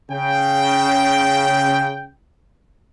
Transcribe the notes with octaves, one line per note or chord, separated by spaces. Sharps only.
C#3 G5